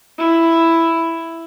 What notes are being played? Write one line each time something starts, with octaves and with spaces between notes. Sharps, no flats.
E4